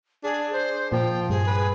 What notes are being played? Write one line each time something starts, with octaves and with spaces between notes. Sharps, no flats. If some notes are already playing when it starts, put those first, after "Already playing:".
D4 G#4
C5
A#2 F3 G5
G2 G#4
B4